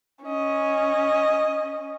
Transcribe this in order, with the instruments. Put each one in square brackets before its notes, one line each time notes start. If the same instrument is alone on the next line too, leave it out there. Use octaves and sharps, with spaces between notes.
[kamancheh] C#4 D#5